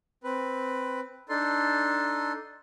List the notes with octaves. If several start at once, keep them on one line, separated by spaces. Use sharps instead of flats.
C4 B4
D4 D#4 A4 C6